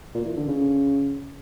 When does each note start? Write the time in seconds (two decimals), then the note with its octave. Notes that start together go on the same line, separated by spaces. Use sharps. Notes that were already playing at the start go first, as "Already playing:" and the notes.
0.15 A#2
0.26 E3
0.37 D3
0.48 C#3